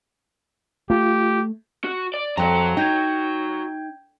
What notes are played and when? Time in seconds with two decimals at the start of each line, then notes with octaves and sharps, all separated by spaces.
0.90 A3 F4 G4
1.84 F#4
2.14 D5
2.37 F2 F#4 A#5
2.77 D#4 G5 G6 G#6